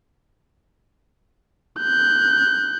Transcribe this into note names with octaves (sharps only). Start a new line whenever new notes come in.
F#6 G6